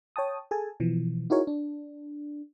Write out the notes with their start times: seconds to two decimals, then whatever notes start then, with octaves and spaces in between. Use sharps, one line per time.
0.16 C#5 G5 A5 D#6
0.51 G#4 A4 G#5 A5
0.80 B2 E3 F3
1.30 D#4 E4 F#4 G#4 A#4 C#5
1.47 D4